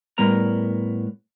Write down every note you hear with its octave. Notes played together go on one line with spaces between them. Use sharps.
A2 G3 B3 A#4 A#5